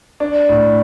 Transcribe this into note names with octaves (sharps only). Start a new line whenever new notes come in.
D4
A2